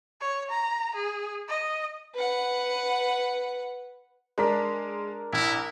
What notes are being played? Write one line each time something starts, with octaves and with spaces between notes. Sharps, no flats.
C#5
A#5
G#4
D#5
B4 F#5
G#3 D4 A#4 D5 B6
A#1 E4